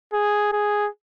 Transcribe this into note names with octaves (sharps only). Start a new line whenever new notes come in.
G#4
G#4